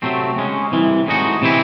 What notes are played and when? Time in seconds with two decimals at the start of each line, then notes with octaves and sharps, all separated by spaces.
0.02 C3 F#3 A3 C4
0.37 C#3 G#3 C#4
0.72 C2 C3 E3
1.07 A2 G#3 D#4 F#4
1.42 C3 E3 C4 E4